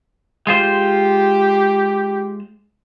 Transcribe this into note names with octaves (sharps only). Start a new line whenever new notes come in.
G#3 F4 G4 C5